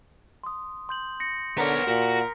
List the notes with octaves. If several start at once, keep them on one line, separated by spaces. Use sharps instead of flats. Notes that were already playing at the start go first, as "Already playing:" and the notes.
C6 D#6
C6 G6 F#7
A#6 C#7
D3 B3 A#4 C#5 A#5
A#2 F#4 A#6 B6